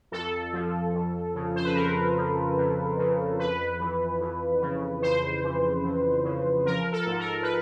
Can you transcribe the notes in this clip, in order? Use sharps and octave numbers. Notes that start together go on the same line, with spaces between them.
F2 A4
F3
F2
C#3
C5
B4
F2 A#4
F3
F2
C#3
F2 B4
E3
F2
C#3
F2 C5
E3
F2
C#3
F3 A#4
A4
G#2
A#4
B4